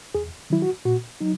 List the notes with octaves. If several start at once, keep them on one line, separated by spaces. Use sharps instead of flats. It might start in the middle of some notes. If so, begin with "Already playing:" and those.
E2 G#4
D#3 F#3 E4
F#4
A#2 F#4
F#3 D#4